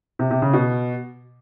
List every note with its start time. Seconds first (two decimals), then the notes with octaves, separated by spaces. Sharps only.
0.19 C3
0.31 C3
0.42 C#3
0.53 B2